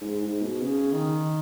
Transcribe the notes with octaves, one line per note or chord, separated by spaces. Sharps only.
G#2
G#2
B2
C#3
D#3